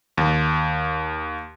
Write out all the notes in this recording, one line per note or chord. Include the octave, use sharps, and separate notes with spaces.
D#2